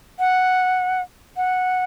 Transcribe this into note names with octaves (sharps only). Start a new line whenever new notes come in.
F#5
F#5